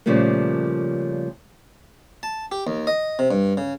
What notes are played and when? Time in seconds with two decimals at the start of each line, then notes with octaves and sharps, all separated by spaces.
0.06 A#2 C#3 F3 G3 A3 A#3
2.23 A5
2.52 G4
2.67 D#2
2.87 D#5
3.19 C3
3.31 G2
3.57 C#3